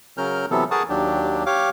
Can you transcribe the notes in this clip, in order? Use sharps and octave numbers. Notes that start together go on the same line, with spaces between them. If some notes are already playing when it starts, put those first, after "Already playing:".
C#3 F#3 C#4 A#4 F6 G6
C3 E3 F#3 B3 A4
G#4 A#4 F#5 A5 C#6 D#6
D#2 F#3 D4 G4
G4 C#5 F5 D6